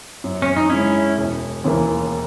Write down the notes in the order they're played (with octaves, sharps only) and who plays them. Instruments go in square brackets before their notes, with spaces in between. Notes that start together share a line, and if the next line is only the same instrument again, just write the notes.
[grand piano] F#2
[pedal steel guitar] C#4
D#4
[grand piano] C#3 G#3 [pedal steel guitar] C#4 E4
[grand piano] E1
D#2 C#3 E3 A#3